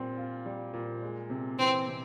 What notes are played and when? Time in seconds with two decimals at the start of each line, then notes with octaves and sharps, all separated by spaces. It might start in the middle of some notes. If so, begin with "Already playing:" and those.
Already playing: A#2 G3 C4
0.18 F4
0.46 G3
0.73 A#2
1.02 G#3
1.30 C3
1.59 E3 C4
1.87 C3